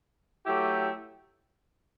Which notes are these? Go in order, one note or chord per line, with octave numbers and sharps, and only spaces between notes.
F#3 A3 E4 G4